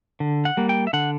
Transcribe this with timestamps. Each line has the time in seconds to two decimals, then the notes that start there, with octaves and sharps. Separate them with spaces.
0.20 D3
0.45 F#5
0.57 G3 A#3
0.69 G5
0.87 E5
0.93 D3 F#5